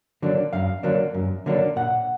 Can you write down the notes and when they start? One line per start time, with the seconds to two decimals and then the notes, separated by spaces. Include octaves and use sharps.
0.22 D3 F#3 A#3 D4
0.53 F#2 F5
0.83 D3 F#3 A#3 D4
1.14 F#2
1.46 D3 F#3 A#3 D4
1.76 A#2 F#5